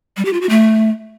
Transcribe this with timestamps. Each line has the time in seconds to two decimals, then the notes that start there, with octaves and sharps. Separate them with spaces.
0.17 G3
0.25 G4
0.33 F4
0.41 F#4
0.49 A3